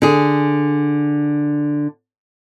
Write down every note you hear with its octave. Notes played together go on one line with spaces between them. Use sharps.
D3 G#4